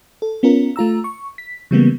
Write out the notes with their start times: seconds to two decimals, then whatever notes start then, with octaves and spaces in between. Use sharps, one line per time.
0.22 A4
0.43 B3 C#4 F4 A#4
0.76 A3 F4 A#5 E6
1.04 C#6
1.38 B6
1.71 C#3 E3 G3 G#3 A#3 B3